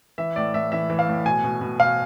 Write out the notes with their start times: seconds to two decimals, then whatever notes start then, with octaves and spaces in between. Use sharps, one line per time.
0.18 E3 E5
0.36 A2 D5
0.54 A2 E5
0.72 E3 E5
0.90 E3
0.99 F5
1.08 A2
1.26 B2 G#5
1.44 B2
1.61 B2
1.80 B2 F5